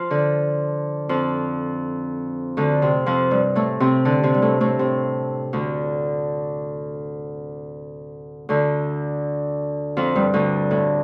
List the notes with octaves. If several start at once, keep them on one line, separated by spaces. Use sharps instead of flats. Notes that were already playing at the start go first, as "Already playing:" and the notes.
Already playing: F3 F4
D3 D4
F2 F3
D2 D3
C3
F2 F3
G2 G3
A2 A3
C3 C4
D3 D4
C3 C4
G3
A2 A3
A2 A3
C3
D2 D3
D2 D3
F2 F3
G2 G3
D2 D3
A2